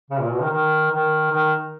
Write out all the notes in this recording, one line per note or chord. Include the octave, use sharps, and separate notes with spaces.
C#3
A#2
B2
D#3
D#3
D#3
D#3